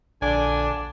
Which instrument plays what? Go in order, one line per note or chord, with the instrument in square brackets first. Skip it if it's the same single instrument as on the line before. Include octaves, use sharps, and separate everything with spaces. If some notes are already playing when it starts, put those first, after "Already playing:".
[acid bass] A#1 [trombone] D3 [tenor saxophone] D4 [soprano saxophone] G#5